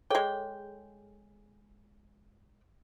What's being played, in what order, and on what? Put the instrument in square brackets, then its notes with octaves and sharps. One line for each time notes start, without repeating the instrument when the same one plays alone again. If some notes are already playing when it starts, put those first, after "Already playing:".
[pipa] G#3 G5 [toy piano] G#4 A4 C#5